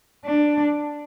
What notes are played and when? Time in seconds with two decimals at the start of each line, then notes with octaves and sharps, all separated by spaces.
0.25 D4